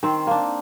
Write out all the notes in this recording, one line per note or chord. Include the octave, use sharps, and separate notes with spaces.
D#3 C4 C5
A#3 D4